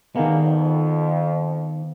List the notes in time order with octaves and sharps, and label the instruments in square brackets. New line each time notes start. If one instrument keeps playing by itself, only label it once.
[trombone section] G2 G#3 A#3 [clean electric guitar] D#3 B3
[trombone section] F2